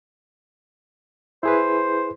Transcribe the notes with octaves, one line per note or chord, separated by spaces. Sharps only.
E4 G#4 B4 C5